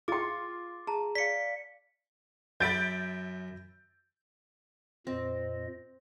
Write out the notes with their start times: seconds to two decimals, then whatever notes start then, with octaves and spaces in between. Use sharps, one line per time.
0.08 F4 G#4 G5 C6 D6 A6
0.87 G#4 A5 A#5
1.15 D5 F5 B6 C#7
2.60 F#2 E5 B5 G6 A6 D7
5.07 F2 A#2 C4 D#5